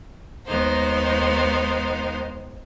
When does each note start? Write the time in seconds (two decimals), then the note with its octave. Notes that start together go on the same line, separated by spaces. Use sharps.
0.46 D#2 G#3 B3 D#4 C5